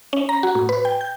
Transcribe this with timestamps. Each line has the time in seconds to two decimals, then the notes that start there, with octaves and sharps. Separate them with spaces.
0.13 C#4
0.29 A#5
0.43 F#4
0.55 A2
0.69 B4
0.85 G5
1.01 G6